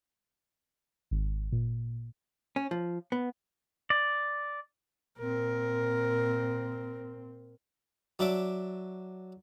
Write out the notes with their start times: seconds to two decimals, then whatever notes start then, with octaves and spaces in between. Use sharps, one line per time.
1.11 G#1
1.52 A#2
2.56 C#4
2.71 F3
3.12 B3
3.90 D5
5.19 A#2 C4 A#4
8.19 F#3 D4 E5 D6